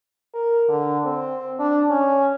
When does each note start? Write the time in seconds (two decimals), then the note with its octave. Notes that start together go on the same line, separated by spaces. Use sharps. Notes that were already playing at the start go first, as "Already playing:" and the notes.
0.34 A#4
0.68 D3
1.05 C4
1.59 D4
1.90 C#4